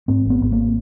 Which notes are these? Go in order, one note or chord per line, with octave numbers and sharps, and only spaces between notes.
G#2 C4
G#1
B3
G#1
A#3